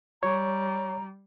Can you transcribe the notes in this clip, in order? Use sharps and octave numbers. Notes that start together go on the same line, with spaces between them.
G3 C#5 A#5